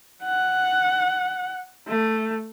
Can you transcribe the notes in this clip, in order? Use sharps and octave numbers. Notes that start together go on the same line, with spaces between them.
F#5
A3